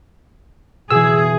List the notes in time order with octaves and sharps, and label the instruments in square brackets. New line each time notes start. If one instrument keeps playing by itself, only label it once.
[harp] B2 E3 [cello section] G#4 [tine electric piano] E6